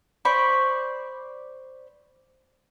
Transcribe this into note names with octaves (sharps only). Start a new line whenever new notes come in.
C5 D5 B5 C#6